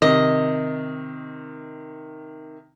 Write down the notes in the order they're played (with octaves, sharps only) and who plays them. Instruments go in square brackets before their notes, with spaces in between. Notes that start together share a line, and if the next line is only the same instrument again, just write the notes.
[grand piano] C3 D#3 [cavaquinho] D#5